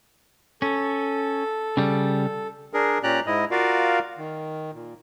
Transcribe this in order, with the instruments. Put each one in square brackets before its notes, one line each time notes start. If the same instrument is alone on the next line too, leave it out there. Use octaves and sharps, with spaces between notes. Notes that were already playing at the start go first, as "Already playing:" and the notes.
[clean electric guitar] C#4 [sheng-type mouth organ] A4
[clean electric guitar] C#3 G3
[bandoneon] D4 G#4 A#4
A#2 C#4 G4 D5 A#5 F#6
G#2 E4 D#5
F4 F#4 A#4 D5 F5
D#3
A#2